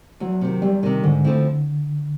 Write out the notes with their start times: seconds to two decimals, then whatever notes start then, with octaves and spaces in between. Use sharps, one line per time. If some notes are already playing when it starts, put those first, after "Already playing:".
0.20 E2 F#3
0.41 C3 D#3
0.62 E2 G3
0.83 C3 D#3
1.03 G#2 D3
1.24 F3 A3 C4 E4